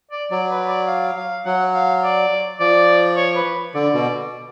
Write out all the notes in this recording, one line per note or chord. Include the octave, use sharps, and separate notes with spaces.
D5
F#3 D5
B4
D5
F5
F5
F#3 F#5
F5
D5
F3 D5
C#5
B4
D3 D5
B2